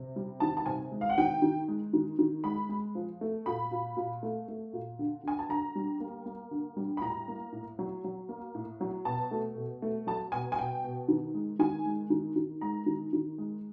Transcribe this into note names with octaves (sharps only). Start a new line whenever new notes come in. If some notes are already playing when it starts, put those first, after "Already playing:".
Already playing: C3
G3
D#3 A5
A5
C3 G#5
G#3
F5
F#5
D#3 G5
D#3
G#3
D#3
D#3
G#3 B5
G#3
F3
A3
A#2 B5
A#2
A#2
A3
A3
A#2
D3
D3 G#5
A5
D3 A#5
G3
A#3
A#3
D3
G3
B5
A2 A#5
A#3
A2
F#3
F#3
A#3
A2
F#3
B2 A5
A3
B2
A3
F#3 A5
B2 G#5
G#5
B2 G5
B2
D#3
G#3
D#3 G#5
G#3
D#3
D#3
G#3 A#5
D#3
D#3
G#3